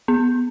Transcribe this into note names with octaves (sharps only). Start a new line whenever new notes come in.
B3